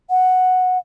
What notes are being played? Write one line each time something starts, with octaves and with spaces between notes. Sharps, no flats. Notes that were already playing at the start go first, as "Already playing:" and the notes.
F#5